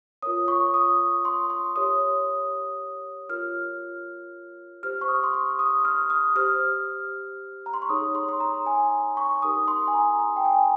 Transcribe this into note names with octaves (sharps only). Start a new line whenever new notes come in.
F4 A#4 C#5 D#6
C#6
D#6
C6
C6
G4 A#4 C#5 D#6
F4 A#4 C#5 F6
G4 C5 F6
C#6
D#6
C6
C#6
D#6
F6
D#6
G4 C5 F6
A#5
C6
C#6
D#4 G#4 C#5 D#6
C6
C6
A#5
G#5
C#6
D#4 G4 A#4 D#6
C6
G#5
A#5
A#5
G5
G#5